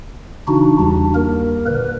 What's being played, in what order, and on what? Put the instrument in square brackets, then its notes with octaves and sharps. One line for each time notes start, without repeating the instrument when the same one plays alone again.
[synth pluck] C#3 E3 [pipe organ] D4 D#4 F#4
[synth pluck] E2 G3 [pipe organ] D4
[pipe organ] A#3 A#4
[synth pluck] A#2 D3 [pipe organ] B4